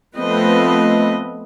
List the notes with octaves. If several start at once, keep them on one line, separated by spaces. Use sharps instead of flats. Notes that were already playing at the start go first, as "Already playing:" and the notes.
F3 A3 B3 C4 B4 D#5